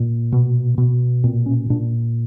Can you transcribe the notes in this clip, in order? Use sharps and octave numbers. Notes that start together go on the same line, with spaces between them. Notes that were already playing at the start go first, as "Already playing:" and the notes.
Already playing: A#2
B2
B2
A#2 C4
C#4
A#2 D4